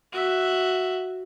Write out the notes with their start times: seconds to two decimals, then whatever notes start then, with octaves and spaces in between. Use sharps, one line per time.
0.12 F#4 E5